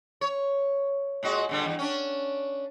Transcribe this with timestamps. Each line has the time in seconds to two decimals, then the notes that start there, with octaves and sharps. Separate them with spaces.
0.21 C#5
1.23 A#2 G#3 F#4
1.49 A#2 D3 G3
1.65 E2 G2
1.79 C#4 D4